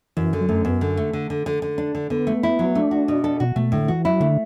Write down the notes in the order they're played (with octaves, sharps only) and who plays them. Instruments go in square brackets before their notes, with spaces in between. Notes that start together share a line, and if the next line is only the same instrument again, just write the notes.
[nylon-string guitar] F#2 [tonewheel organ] E3
[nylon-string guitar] D3
[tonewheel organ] F#3
[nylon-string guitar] F#2 [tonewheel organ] A3
[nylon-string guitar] F#2 [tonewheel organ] B3
[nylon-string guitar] D3
A3
D3
D3
D3
D3
D4
D3
[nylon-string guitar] D3 [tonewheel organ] B3
[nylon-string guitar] A3
E4
F#3
[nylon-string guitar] A3 [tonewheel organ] D4
[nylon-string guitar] F#4
B2
A4
[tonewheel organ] B2 [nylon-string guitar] F#4
[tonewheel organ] B2 [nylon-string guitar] A3
[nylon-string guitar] A2 [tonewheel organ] D3
[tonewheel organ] E3 [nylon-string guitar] F#4
[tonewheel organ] F#3 [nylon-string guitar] E4
[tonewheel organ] D3 [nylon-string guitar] A3